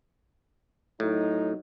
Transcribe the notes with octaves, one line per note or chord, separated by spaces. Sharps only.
A2 F#3 D#4